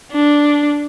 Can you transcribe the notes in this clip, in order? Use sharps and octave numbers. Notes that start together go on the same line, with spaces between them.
D4